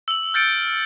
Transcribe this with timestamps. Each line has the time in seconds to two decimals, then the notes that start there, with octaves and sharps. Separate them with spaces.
0.08 E6 F#7
0.34 F6 G6 A6 C#7 D7